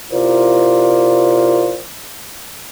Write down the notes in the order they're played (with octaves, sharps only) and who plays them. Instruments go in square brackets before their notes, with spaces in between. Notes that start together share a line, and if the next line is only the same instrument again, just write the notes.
[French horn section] C3 E4 F4 A#4 C5 D5